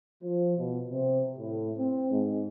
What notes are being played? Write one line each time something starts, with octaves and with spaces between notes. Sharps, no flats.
F3
B2
C3
A2
C4
G#2